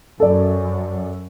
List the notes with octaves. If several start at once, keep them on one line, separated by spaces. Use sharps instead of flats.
F#2 A4 D5